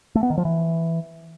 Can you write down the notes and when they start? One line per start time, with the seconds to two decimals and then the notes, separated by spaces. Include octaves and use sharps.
0.15 A3
0.23 B3
0.30 D#3
0.38 F3
0.45 E3